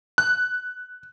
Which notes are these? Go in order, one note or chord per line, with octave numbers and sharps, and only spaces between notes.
F#6